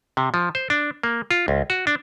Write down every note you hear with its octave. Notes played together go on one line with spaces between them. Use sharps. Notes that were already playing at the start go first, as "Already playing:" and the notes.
C3
F3
C5
D4
A#3
F4
C#2
F#4
D4